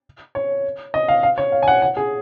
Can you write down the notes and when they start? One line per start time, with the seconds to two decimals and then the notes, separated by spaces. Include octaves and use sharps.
0.35 C#5
0.94 D#5
1.08 F5
1.23 F5
1.38 C#5
1.52 F5
1.63 G#5
1.68 F#5
1.82 F#5
1.97 G#4